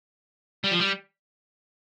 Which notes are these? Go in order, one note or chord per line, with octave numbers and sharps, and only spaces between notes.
G3
F3
G3